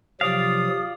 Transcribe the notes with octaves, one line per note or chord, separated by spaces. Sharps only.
C3 F3 F#3 F4 G4 D5 F5 D#6